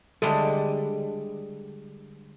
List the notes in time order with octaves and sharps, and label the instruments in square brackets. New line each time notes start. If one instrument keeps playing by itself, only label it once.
[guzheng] D3 G3 G#3 [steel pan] A4